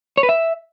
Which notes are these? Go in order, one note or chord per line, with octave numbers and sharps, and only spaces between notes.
C#5
B4
E5